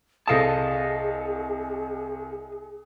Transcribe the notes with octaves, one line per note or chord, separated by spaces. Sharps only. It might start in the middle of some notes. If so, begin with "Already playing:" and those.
C2 G#4 A4 D#5 F5 A5 D#6